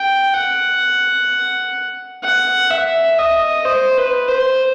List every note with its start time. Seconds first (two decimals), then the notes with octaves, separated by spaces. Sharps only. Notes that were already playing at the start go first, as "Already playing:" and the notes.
Already playing: G5
0.34 F#5
2.23 F#5
2.71 E5
3.19 D#5
3.65 C5
3.97 B4
4.28 C5